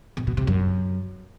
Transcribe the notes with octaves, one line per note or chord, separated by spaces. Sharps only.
B2
B2
C3
F#2